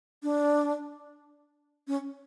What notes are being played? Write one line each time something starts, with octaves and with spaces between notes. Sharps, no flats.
D4
C#4